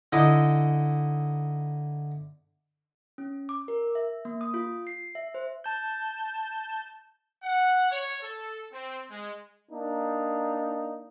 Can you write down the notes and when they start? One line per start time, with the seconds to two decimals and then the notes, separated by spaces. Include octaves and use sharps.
0.13 D3 D#4 E4 D#5
3.18 C#4
3.49 D6
3.68 A#4
3.95 E5
4.25 A#3
4.41 D#6
4.54 F4
4.87 C7
5.15 E5
5.35 C5
5.64 A5 G6
7.43 F#5
7.91 C#5
8.23 A4
8.72 C4
9.10 G#3
9.71 A#3 D4 D#4